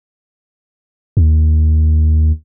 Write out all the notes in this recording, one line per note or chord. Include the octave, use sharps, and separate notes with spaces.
D#2